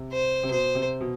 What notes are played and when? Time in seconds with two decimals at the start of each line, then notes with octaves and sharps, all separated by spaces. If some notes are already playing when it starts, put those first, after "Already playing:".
Already playing: C3
0.12 C5
0.43 C3
0.51 B2 C5
0.75 C3
1.00 B2